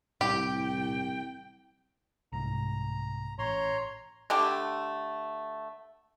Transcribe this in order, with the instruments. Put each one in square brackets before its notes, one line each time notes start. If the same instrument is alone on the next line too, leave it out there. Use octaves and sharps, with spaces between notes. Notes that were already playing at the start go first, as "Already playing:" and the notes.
[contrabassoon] C2 [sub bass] A2 [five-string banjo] G4 [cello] G5
[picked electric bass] C2 G#2 [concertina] A#5
[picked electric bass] A1 [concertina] C#5 A#5 C6
[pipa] D3 A3 G4